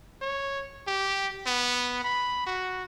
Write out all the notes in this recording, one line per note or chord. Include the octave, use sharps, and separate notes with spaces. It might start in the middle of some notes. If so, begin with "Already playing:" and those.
C#5
G4
B3
B5
F#4